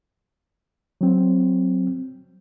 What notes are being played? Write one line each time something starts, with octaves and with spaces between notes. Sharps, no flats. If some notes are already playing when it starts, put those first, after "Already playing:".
F#3 C4